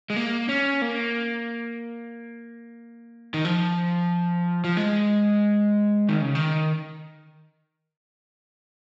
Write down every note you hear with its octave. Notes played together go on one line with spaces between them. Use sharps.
G#3
A#3
C#4
A#3
D#3
F3
F3
G#3
D#3
C#3
D#3